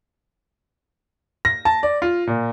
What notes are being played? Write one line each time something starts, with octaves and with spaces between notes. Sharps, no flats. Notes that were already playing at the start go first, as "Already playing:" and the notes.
A#6
A5
D5
F4
A#2